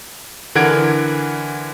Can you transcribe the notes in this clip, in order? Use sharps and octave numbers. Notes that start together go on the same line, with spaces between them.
D3 E3 A#4 F#5 G#6 D7